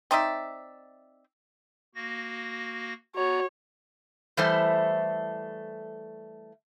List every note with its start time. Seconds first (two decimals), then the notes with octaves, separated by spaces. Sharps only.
0.11 C4 D#4 D5 E5
1.95 A#3 F#4 A#6
3.16 B3 F#4 C#5 A#5
4.37 E3 G3 A3 A4 C5 E5